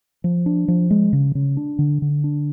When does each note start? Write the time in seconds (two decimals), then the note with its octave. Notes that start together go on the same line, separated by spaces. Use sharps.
0.24 F3
0.46 D4
0.68 F3
0.91 G#3
1.13 C#3
1.35 C#3
1.57 D4
1.79 D3
2.02 D3
2.24 D4